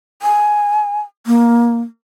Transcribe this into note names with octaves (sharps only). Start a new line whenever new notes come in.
G#5
A#3